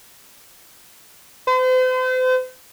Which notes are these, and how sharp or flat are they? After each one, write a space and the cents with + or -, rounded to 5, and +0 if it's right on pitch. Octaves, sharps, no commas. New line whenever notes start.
C5 -40